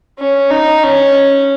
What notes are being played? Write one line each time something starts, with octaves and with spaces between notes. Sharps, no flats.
C#4
D#4
C#4